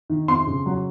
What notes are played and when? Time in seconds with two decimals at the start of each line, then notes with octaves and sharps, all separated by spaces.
0.10 D#3
0.28 F2 C6
0.47 C#3
0.66 F#3